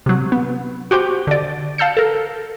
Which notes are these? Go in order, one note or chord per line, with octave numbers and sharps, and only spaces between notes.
C3 F#3
B3
F#4 G4 C5 G5
D3 D5
F5 A5 E6 G6 C#7
A4 A#4